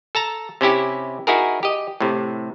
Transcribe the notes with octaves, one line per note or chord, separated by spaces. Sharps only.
A4 A5 A#5
C3 C#4 E4 G4
D#4 E4 F#4 G#4 A#4
G4 D#5
A2 C3